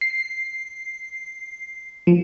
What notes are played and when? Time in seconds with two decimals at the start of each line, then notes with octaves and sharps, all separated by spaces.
0.01 C7
2.07 F3